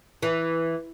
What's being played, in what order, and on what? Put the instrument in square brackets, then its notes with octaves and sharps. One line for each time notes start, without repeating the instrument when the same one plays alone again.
[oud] E3